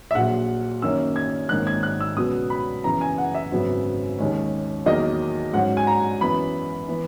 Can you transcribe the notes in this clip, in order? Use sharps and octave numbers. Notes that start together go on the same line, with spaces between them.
E5
A#1 A#2 F#3 F#5
F#2 D#3 A#3 C#4 E6
G#6
G#1 G#2 D#3 A#3 C#4 F#6
G#6
F#6
E6
C#2 B2 F#3 B3 D#6
B5
F#1 F#2 E3 B3 A#5
G#5
F#5
E5
G#1 F#2 C#3 F#3 B3
D#2 D#3 G#3 C#4
E2 D#3 F#3 A#3 D#5
G#2 F#3 C#4 F#5
G#5
A#5
F#2 E3 B3 B5
E3 B3